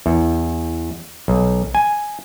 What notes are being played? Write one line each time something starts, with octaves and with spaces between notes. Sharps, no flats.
E2
B1
G#5